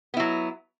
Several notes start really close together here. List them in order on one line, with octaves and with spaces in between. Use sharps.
B3 E4 F#3